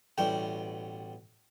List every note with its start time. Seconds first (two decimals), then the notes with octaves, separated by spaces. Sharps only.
0.18 A1 B2 G3 G5